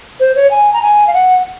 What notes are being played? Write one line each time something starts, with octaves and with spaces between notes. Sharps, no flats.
C5
C#5
G#5
A#5
G#5
F5
F#5